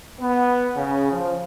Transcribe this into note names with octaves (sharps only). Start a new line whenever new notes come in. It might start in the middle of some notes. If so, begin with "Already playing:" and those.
B3
C#3
F3